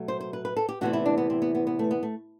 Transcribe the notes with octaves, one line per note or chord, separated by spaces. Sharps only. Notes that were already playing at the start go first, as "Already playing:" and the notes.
Already playing: B2 F#3 A3
C5
C5
B4
B4
A4
G4
E2 C3 E3 A3 F#4
E4
D4
B3
C4
B3
B3
B3
A3
B3
A3